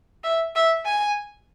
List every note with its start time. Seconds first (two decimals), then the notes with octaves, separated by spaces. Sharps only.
0.24 E5
0.56 E5
0.85 G#5